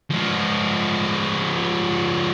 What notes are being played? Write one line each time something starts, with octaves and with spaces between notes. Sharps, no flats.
F3 G#3